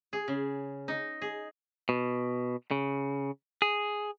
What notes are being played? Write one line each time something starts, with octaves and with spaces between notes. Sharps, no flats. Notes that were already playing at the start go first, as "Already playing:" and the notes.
G#4
C#3
D#4
G#4
B2
C#3
G#4